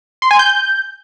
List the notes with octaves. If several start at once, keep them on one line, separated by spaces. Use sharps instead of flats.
C6
G#5
G6